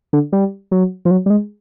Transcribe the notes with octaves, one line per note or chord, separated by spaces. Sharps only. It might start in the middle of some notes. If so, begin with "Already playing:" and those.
D3
G3
F#3
F3
F#3
G3
G#3